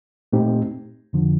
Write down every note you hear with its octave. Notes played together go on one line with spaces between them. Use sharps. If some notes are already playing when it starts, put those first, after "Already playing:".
A#2 A3 C4 D#4 G4
F2 D3 F3